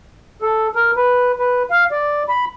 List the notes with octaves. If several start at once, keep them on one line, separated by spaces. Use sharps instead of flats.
A4
A#4
B4
B4
F5
D5
B5